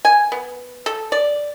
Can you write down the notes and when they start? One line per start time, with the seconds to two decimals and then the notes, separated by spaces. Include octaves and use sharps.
0.05 G#5
0.32 B3
0.86 A4
1.12 D5